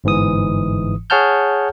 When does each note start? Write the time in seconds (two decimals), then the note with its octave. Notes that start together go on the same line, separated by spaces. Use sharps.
0.04 G1 G#2 E3 D#6
1.10 G#4 C#5 F#5 A5 F6 G6